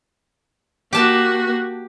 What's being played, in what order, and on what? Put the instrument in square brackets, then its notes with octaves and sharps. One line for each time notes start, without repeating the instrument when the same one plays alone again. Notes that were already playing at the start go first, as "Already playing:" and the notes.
[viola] A#3 F#4 [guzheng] G4 A5